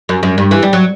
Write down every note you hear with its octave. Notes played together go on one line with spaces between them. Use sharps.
F#2
F#2
G2
E3
G3
F#3